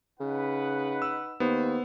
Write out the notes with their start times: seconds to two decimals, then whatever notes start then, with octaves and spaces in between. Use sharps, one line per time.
0.20 C#3 D#4 B4 F#5
1.02 E6
1.40 D#2 B3 C5